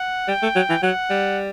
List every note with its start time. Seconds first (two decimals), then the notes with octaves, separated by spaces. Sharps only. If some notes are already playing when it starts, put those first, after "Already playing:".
Already playing: F#5
0.28 G3 G5
0.43 A3
0.56 F#3
0.70 E3
0.83 F#3 F#5
1.10 G3